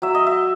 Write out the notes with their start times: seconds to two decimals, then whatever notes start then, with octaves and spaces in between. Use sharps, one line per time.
0.02 F#3 E5
0.15 D#5
0.27 E5